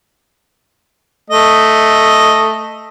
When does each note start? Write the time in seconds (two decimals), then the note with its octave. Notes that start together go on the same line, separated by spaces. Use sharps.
1.30 A3 D#5